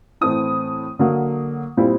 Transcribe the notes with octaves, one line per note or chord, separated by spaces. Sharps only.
A2 E3 A3 C4 E4 D#6
D3 F#3 A#3
A#2 G3 C4 E4